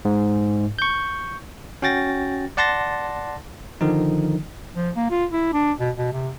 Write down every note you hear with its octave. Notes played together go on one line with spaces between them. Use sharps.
G#2
C#6 G6
C#4 F#4 G5 A6 A#6
D5 F#5 A5 C6 A6 A#6
D3 D#3 F3 D#4
F3
A#3
F4
E4
D4
B2
B2
C3